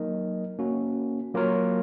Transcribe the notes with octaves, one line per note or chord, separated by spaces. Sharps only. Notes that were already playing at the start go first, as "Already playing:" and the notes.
Already playing: F#3 A#3 D#4 A#4 D#5
A#3 C#4 F#4
F#3 A#3 F4 A#4 C#5